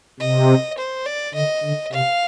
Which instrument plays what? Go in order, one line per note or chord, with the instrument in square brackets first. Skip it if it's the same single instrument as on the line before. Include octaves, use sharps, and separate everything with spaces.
[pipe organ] C3 [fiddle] D#5
[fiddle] C5
D5
[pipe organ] D3 [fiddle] D#5
[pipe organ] D3
[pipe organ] C3 [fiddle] F5